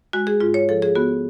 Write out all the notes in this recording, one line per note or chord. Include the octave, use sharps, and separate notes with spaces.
G#3 F#4
G#4
G#2 F4
C#5
F3 A4
G#4
B3 F#4